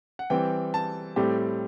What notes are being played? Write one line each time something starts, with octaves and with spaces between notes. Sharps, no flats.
F#5
E3 G3 C4 G5
A5
A2 G3 C4 G4